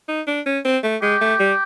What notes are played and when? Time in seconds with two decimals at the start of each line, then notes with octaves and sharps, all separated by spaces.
0.08 D#4
0.27 D4
0.46 C#4
0.64 C4
0.83 A3
1.02 G#3 G4
1.21 A3
1.40 G3